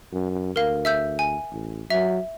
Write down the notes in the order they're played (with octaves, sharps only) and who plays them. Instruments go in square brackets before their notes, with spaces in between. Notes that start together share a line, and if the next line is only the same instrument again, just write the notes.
[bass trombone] F#2
[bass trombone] D2 [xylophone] A#4 F5
[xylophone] E5 E6 G6
G#5
[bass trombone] A1
[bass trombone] F#3 [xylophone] E5